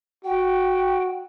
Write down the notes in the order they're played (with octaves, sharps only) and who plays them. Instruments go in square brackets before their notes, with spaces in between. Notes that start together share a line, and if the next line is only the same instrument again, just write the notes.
[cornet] F#4 [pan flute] G5